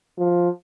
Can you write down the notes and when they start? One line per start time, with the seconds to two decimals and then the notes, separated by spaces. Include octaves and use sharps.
0.18 F3